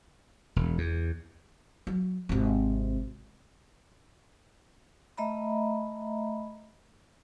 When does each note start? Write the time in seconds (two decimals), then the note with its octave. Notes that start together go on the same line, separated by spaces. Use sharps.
0.56 E1
0.78 E2
1.87 F#3
2.29 G#1 C3
5.17 A3 D#5 E5 A#5 B5